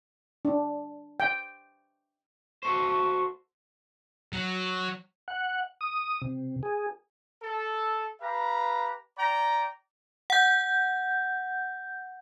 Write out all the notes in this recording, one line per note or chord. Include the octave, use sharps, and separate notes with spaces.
D4
G5
F#4 A4 C5 C#6
F#3
F#5
D#6
C3
G#4
A4
G4 B4 F5 A#5
D5 G5 A#5
F#5 G6